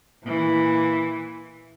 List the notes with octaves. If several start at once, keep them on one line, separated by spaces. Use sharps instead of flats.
A#2 E3